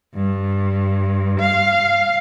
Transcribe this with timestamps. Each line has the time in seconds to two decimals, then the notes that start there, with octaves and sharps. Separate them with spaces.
0.16 G2
1.41 F5